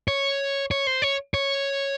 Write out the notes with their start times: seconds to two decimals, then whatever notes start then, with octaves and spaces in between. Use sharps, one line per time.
0.08 C#5
0.71 C#5
0.87 C5
1.02 C#5
1.34 C#5